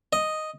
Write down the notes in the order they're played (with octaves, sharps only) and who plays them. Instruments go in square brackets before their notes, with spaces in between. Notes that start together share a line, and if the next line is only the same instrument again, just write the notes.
[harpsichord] D#5